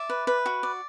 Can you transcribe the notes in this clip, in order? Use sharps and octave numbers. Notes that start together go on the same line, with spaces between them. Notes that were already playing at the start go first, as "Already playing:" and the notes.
Already playing: D5 E5
B4
B4
F#4
D5